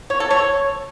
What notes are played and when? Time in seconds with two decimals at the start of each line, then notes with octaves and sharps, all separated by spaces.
0.10 C#5
0.20 A4
0.31 C#5